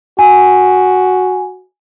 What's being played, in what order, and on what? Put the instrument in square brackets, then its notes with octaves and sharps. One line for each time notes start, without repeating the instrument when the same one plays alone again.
[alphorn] F#4 [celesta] G#5